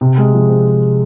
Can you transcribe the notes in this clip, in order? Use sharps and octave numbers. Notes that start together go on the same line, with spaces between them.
C3
G#3
F3
C4